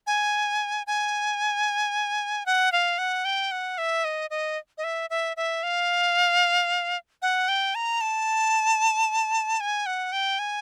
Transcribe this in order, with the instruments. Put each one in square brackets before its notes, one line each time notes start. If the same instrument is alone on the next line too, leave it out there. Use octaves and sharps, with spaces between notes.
[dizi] G#5
G#5
F#5
F5
F#5
G5
F#5
E5
D#5
D#5
D#5
E5
E5
E5
F5
F#5
G5
A#5
A5
G#5
F#5
G5
G#5